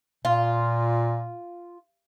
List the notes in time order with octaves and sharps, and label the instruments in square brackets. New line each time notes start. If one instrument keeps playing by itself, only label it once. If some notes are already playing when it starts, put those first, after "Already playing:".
[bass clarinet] A#2 [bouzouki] F4